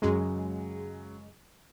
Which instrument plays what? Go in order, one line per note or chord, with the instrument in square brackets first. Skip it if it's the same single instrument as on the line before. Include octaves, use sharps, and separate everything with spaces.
[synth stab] F#2 G#3 [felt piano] C#3 F#3